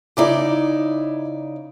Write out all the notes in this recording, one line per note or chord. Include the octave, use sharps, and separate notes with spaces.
C#3 D#4 E4 D5 A#5 D6